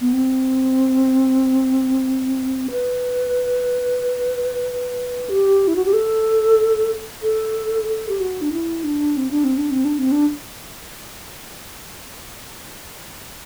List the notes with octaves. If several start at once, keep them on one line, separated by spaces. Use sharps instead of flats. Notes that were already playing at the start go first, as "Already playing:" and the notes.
B3
C4
B4
G4
E4
F#4
G4
A4
A4
A4
G4
F#4
D4
E4
D4
C4
D4
C4
D4
C4
D4
C4
D4